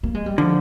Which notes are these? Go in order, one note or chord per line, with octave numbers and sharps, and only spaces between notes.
A#3
G#3
G3
D3 F3